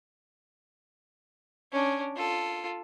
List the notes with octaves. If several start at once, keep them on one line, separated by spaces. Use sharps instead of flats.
C#4 D4
F4 A4